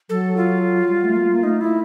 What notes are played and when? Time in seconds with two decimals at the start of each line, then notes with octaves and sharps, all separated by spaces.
0.09 F#3 A4
0.37 F4
0.89 G3
1.03 A3
1.16 A#3
1.29 A#3
1.43 A3 D#4
1.61 E4